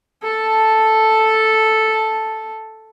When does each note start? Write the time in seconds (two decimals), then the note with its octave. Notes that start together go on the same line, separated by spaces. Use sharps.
0.23 A4 A5